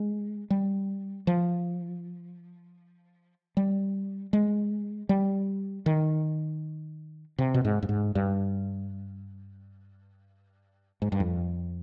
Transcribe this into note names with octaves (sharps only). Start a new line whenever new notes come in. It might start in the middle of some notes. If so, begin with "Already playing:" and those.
Already playing: G#3
G3
F3
G3
G#3
G3
D#3
C3
B2
G#2
G2
G#2
G2
G#2
G2
F2